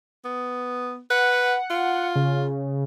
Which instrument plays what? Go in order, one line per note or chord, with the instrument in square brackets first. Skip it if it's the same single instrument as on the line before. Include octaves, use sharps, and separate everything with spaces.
[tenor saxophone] B3
[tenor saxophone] B4 [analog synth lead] F#5
[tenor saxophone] F4
[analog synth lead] C#3